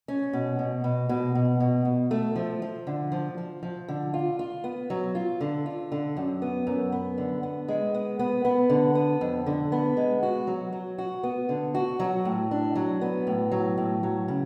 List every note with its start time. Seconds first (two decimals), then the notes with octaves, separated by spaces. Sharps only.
0.08 C#4
0.33 B2
0.59 B2
0.84 B2
1.09 B2
1.35 B2
1.60 B2
1.85 B2
2.11 A3
2.36 F3
2.62 F3
2.87 D3
3.12 F3
3.38 F3
3.63 F3
3.89 D3
4.14 F4
4.39 F4
4.64 B3
4.90 F#3
5.15 F4
5.41 D3
5.66 F4
5.92 D3
6.17 F#2
6.42 B3
6.67 F#2
6.92 B3
7.18 D3
7.43 B3
7.68 G#3
7.94 B3
8.19 B3
8.45 B3
8.70 D3
8.95 B3
9.21 F2
9.46 D3
9.72 B3
9.97 G#3
10.23 F#4
10.47 F#3
10.73 F#3
10.98 F#4
11.23 B3
11.49 D3
11.75 F#4
12.00 F#3
12.25 A2
12.51 D4
12.75 F#3
13.01 B3
13.27 A2
13.52 F#3
13.78 A2
14.03 F#3
14.28 C#3